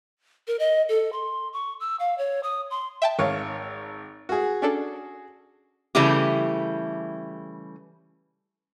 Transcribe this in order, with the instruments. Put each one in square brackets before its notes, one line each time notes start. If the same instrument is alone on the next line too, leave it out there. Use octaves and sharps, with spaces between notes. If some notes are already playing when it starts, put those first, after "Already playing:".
[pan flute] A#4
D#5
A4
C6
C#6
E6
F5
C#5
D#6
C6
[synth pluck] E5 G5 A5
[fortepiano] G#1 C#5 F5
F#4 G#4
[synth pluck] C#4 D4 A4
[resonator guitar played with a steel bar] C#3 E3 G3 A3 E4 G4